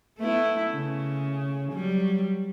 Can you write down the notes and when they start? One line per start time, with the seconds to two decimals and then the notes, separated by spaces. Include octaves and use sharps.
0.18 A3 B3 E4
0.73 C#3
1.72 F#3 G3